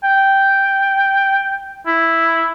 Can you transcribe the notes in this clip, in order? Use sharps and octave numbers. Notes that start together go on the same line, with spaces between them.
G5
E4